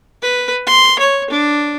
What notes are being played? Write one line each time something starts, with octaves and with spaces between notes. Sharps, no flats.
B4
C6
C#5
D4